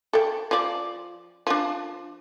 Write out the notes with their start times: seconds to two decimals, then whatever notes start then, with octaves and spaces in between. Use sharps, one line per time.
0.13 A4 G5
0.51 F3 D5
1.47 F3 D4